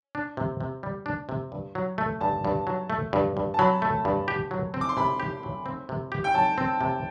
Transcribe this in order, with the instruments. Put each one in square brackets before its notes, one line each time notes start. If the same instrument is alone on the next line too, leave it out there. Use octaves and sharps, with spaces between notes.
[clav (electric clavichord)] D4
C3
C3
G3
D4
C3
G2
F#3
A3
[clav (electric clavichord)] G2 [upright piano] A5
[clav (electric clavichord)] G2
F#3
A3
G2
G2
[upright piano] A5
[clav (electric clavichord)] F#3 [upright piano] B5
[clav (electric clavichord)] A3
G2
G4
F#3
C4
[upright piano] D6
C6
[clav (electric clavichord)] C3 [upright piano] B5
[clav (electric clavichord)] G4
F#3
C4
C3
G4
[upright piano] G5
[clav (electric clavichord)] F#3 [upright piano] A5
[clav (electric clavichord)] C4
C3